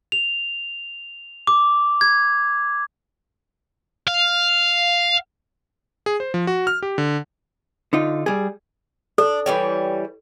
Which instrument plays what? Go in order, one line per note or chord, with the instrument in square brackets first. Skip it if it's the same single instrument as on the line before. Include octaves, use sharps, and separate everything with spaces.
[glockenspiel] F7
D6
G#6
[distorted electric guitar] F5
[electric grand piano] G#4
C5
F3
F#4
F6
G4
D3
[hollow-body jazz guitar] D3 D#4 F4
G3 G#4
[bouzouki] D4 [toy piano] A4
[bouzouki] E3 G3 C#5